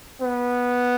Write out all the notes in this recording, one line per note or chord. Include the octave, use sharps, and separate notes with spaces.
B3